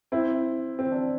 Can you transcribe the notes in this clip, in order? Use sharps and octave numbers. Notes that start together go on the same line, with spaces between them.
C4 E4
C4
D4